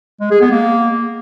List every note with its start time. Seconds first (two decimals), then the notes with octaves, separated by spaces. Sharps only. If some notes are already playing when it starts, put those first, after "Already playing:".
0.21 G#3
0.31 G#4
0.41 B3
0.51 A#3